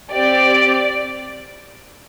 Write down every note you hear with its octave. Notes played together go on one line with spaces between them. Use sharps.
C4 G4 D5